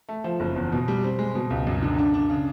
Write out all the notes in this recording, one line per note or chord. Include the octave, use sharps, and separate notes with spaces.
A3
F3
F#1
E2
B2
G3
C4
G#3
B2
C#2
F#2
D3
D4
D4
C#3